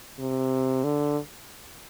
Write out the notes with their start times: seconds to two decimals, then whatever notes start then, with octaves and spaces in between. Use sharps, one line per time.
0.19 C3
0.84 D3